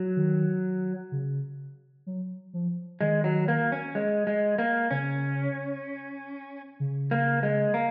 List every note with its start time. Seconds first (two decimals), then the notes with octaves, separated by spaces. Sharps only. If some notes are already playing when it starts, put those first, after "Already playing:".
Already playing: F#3
0.16 D#3
1.12 C#3
2.06 F#3
2.54 F3
3.01 D#3 G#3
3.24 F#3
3.48 A#3
3.72 C#4
3.95 G#3
4.27 G#3
4.58 A#3
4.91 C#3 C#4
6.80 C#3
7.11 A#3
7.43 G#3
7.74 A#3